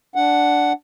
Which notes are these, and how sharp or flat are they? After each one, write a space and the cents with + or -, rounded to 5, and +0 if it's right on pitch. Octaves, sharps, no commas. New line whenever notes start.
D4 -5 F#5 +0